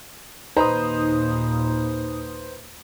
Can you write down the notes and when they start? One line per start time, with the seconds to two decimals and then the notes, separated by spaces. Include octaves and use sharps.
0.56 D#2 A#2 D#4 B4 C5 A#5 D#6